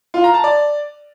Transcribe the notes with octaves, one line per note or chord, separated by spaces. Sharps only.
F4
A#5
A5
D5